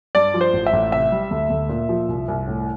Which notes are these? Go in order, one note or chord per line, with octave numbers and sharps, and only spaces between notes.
G2 D5
F3
C5
A1
E5
A1
C3 E5
G3
D2
D2
A#2
F3
C2
C2
A2